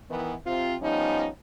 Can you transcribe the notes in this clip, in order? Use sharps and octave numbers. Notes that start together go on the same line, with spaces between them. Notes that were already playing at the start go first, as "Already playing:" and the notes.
D#3 E3 B3
C3 C4 F4
F3 G3 B3 C#4 D#4